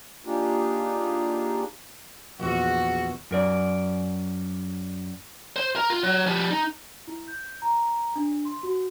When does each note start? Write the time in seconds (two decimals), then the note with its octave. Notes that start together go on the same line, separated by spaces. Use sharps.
0.25 A#3 D4 D#4 F4 G4 G#4
2.40 A#1 E2 F#4
3.31 F#2 A#4 D5
5.56 C5 C6
5.76 A#4
5.90 F4
6.03 F#3
6.26 F3 G3
6.51 D#4
7.07 E4
7.28 G6
7.62 A#5
8.16 D4
8.45 C6
8.63 F#4